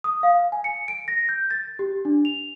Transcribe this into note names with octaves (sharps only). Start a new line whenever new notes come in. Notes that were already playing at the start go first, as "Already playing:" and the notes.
D#6
F5
G#5
C#7
D7
A#6
G6
A6
G4
D4
F7